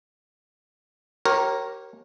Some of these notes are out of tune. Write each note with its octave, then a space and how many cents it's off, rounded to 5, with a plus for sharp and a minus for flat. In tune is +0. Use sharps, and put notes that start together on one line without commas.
G4 -30 A#4 +0 C#5 -30